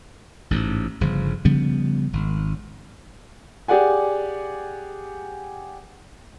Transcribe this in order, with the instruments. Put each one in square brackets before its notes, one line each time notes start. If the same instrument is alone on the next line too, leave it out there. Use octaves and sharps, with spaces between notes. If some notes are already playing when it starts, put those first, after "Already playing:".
[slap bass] A1 G#2
G1 C#3 F3
C#3 F3 G3 B3
G#1
[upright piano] G4 G#4 D5 F#5 G#5